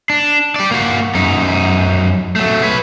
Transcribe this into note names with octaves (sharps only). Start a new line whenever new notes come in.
D4
G4 D5
A#3 F#4
F#2 D#4
F#3 A3
B4 C#5